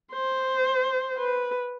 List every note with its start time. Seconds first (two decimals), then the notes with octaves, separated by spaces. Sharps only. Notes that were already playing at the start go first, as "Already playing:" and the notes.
0.13 C5
1.18 B4